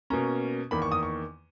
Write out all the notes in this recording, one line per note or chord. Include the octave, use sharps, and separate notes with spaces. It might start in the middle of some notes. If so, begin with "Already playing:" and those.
B2 A#3 C#4 A#5
E2 D#3 A#3 B5
C#6
D#6
C#6